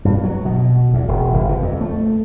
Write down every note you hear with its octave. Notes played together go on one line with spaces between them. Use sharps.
G2
F#3
B2
E2
E1
G1
C3
F2
A3